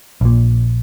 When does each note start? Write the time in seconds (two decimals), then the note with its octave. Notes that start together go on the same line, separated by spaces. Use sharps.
0.21 A#1 A#2